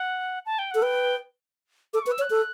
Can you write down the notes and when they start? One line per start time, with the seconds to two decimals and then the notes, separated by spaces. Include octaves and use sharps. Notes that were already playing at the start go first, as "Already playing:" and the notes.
Already playing: F#5
0.46 A5
0.59 G5
0.71 A4 F#5
0.82 B4 G5
1.94 A4 D6
2.02 C#6
2.07 B4
2.11 E6
2.19 C#5
2.22 F#6
2.30 A4